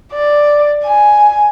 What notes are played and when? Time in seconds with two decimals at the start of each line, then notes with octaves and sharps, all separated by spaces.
0.13 D5
0.84 G#5